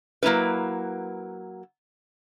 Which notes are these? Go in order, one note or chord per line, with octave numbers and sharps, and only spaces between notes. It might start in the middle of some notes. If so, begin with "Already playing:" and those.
F#3 A#3 D#4 E4 B4